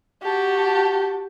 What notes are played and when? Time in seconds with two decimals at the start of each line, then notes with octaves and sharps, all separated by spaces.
0.23 F#4 G4 A5